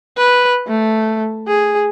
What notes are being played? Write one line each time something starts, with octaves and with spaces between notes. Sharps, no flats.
B4
A3
G#4